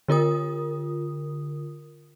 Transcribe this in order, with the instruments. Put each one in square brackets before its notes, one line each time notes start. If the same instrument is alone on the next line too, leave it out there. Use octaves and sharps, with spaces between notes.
[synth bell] D3 F4 A#4 D#6